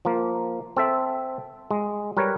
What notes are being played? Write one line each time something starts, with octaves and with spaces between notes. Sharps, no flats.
F3 A#3
C4 A4 E5
G#3
G3 A#4 B4 C#5